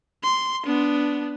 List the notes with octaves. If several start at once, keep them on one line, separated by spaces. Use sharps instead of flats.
C6
B3 D4